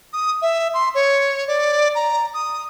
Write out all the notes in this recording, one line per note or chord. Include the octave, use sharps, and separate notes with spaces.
D#6
E5
C6
C#5
D5
A#5
D#6